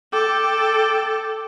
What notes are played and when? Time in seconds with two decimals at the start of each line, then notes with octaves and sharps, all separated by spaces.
0.13 A4 G5 D6